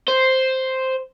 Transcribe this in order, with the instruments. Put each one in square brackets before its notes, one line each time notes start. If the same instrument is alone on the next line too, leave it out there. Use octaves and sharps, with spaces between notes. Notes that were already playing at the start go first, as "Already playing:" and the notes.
[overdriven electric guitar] C5